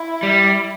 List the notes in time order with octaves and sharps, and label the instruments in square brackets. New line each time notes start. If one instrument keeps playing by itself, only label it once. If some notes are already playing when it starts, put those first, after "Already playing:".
Already playing: [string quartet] E4
[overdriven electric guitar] G3